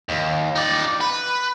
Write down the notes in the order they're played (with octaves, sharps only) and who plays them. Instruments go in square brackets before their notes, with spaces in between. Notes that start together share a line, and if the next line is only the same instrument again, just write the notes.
[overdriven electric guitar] D#2
D#4 D5
B4